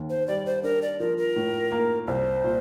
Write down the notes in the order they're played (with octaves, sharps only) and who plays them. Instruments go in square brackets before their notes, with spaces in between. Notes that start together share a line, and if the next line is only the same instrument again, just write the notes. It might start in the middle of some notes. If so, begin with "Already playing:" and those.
Already playing: [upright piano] D#2 D#3
[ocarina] C5
[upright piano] G3 [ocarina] D5
[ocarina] C5
[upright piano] D4 [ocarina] A#4
[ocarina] D5
[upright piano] F3 [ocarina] A#4
[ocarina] A#4
[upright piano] A2
A#3
[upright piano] C2 [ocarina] C5
[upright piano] A#2